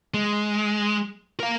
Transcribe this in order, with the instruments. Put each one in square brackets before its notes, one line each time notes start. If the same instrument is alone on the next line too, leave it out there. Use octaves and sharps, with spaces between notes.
[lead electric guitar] G#3
A#4 F5